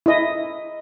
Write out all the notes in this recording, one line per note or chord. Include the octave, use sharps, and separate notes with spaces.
E4 D#5